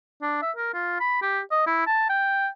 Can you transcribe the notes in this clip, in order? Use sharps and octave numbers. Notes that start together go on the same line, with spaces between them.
D4
E5
A#4
F4
B5
G4
D#5
E4
A5
G5